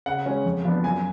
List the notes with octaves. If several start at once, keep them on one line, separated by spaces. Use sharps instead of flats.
C#3 F#5
G#3 C#4
F2
F3 B3 D4
F#2 G#5